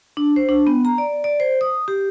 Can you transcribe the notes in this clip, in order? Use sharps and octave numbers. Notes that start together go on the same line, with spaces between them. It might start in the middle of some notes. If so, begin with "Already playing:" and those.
D4
C5
D4
B3
A#5
D5
D5
C5
D#6
G4